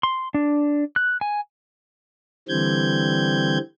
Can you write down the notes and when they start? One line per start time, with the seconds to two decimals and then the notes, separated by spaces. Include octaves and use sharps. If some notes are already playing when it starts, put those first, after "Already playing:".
0.03 C6
0.34 D4
0.96 F#6
1.21 G#5
2.49 D3 E3 G3 C4 G6 G#6